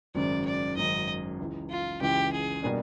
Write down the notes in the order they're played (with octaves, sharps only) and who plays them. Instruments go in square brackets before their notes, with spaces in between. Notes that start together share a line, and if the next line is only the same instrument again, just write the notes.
[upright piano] G#1 F#2 C#3 [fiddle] D5
[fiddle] D5
[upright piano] G#1 F#2 C#3 [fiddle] D#5
[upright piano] C#2 C#3 E3
[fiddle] F4
[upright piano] C#2 C#3 E3 [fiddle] G4
[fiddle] G#4
[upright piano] B2 G3 A#3 D4